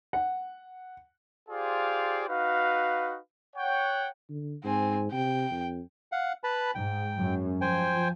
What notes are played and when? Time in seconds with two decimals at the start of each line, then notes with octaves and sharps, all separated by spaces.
0.13 F#5
1.49 F4 G4 G#4 C5 D5 F5
2.29 D#4 F#4 B4 F5
3.56 C#5 F#5 G5
4.29 D3
4.64 G#2 C4 G#5
5.12 C3 G5
5.50 F2
6.12 F5 F#5
6.44 B4 A5 B5
6.75 G#2 G5
7.18 F#2
7.61 F3 C5 G5 G#5